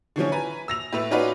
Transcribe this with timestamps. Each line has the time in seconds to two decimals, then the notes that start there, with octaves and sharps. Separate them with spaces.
0.16 D3 E3 F3 C#4
0.32 B4 G#5 A#5
0.68 E6 A#6 F7
0.93 A2 A3 B4 E6 F7
1.11 C#4 D#4 F4 F#4 B4 D5